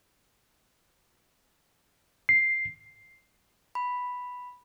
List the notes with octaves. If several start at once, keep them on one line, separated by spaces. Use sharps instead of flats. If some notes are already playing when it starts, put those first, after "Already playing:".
C7
B5